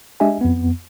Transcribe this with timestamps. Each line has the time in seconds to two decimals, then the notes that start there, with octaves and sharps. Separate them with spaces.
0.20 G#3 D4 G4 D#5 E5 G#5
0.41 F2 B3